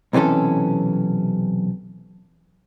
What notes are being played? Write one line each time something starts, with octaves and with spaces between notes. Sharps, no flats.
B1 C3 E3 C#4 A4